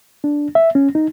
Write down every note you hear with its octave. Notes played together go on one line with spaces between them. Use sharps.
D4
E5
C#4
D#4